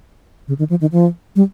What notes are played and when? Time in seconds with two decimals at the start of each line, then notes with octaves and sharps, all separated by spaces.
0.48 C#3
0.59 D#3
0.70 F3
0.81 D#3
0.92 F3
1.36 G3